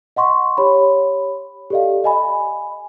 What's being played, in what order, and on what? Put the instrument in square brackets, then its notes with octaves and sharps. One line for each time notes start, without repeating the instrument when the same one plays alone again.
[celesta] D#5 F#5 C6 C#6
G4 C#5 B5
G4 A4 D5 D#5 F5
D#5 G#5 B5